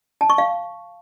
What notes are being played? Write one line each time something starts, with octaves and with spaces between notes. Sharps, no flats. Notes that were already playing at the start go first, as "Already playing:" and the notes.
A5
C#6
F5